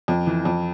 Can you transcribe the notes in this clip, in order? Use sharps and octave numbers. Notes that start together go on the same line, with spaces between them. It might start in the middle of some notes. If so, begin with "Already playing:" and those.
F2
E3
F2